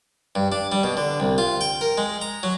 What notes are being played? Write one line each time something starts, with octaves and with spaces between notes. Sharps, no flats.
G2
D4
G3
B2
D3
C2
F4
G5
A#4
G#3
A#5
F#3